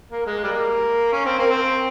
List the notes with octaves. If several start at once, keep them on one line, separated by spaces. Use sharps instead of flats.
A#3
G#3
G3 A#3
C#4
C4
A#3
C4